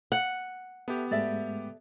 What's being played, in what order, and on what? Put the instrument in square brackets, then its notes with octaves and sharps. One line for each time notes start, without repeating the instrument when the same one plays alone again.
[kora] F#5
[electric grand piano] B3 G4 [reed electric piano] A4 E5
[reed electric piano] G#2 G#3 A3 [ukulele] A4 D5 E5